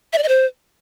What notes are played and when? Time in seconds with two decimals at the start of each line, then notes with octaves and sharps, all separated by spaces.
0.13 E5
0.18 D5
0.23 D#5
0.28 C5